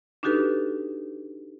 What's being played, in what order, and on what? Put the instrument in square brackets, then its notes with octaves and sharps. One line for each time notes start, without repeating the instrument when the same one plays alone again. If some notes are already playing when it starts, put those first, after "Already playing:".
[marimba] D4 D#4 F#4 G4 A4 B4